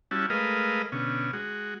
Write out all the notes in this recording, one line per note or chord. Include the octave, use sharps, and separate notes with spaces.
G3 C#4 E4 F#4 A5
G#3 A3 A#4 B4 D#5 F5
B2 D3 C#4
G#3 F#4